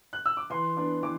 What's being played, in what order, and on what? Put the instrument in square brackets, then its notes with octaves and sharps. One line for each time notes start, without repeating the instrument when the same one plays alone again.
[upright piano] F#6
E6
D6
E3 C6
B3 D4
E3 D6